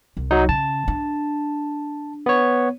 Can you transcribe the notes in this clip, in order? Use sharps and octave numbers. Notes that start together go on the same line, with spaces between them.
C2
F#3 D#4
C#3 A5
D4
B3 C#5